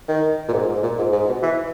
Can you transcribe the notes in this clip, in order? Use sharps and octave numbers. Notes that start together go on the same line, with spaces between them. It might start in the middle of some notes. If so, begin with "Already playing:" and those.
D#3
A#2
G#2
G#2
A#2
G#2
G#2
B2
E3